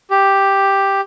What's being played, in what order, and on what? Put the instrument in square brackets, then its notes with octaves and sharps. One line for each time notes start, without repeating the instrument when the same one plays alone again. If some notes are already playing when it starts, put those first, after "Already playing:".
[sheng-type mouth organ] G4